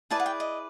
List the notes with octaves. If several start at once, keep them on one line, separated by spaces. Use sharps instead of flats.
E4 G#4 B4 D5 A5
F#5
G5
D#5